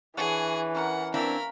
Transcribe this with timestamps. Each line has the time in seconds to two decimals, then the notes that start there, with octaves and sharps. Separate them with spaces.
0.17 E3 D4 G#4 C#5 F#5
0.74 C#4 A#4 F#5
1.14 A#3 C4 D4 E4 A#4 B5